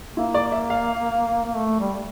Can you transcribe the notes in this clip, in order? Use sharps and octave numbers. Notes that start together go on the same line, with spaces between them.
A#3 E4
D5
E5
F5
A#3
A3
G3